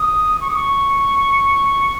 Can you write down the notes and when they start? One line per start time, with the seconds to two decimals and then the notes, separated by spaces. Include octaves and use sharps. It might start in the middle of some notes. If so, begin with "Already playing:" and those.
Already playing: D#6
0.41 C#6
0.48 D#6
0.55 C#6